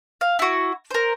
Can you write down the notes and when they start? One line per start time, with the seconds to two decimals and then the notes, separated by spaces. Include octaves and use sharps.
0.21 F5
0.39 E4 F#4
0.91 A#4 C5